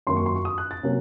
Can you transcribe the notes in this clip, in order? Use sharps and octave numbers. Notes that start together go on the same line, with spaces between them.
F#2 D#3 A#3 C6
C#6
C6
C#6
D#6
F#6
A6
C3 F#3 A#3 C#4